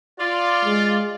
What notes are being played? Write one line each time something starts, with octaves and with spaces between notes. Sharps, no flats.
F4 D5
G#3